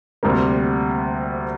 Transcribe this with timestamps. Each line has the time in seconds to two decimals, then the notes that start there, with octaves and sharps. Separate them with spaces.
0.23 D2 C3 G3 A#3